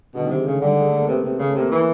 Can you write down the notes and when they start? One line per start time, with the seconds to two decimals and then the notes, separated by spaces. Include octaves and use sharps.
0.15 B2 D3
0.25 C3 D#3
0.36 G#3
0.46 C#3 A3
0.61 D3 G3
0.78 G#3
0.88 A3
0.98 A#3
1.08 C3 B3
1.23 C3
1.39 C#3
1.47 A3
1.55 C3 A#3
1.70 E3 B3